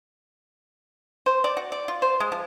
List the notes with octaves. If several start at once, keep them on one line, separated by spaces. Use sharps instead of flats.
C5
D5
F#4
D5
F4
C5
G#3
F3